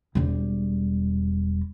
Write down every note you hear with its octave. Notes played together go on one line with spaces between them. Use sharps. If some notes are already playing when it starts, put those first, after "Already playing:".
E1 G3